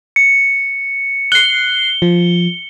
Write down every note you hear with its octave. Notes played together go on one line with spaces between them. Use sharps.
C#7
F#6 C7 G7
F3